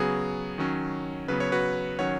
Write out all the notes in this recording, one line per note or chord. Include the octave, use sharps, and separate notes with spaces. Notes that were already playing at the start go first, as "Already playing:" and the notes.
Already playing: C#3 F#3 B3 G#4
D#3 F#3 C#4
C#3 F#3 B3 B4
C#5
F#4 B4
D#3 F#3 C#4 C#5 F#5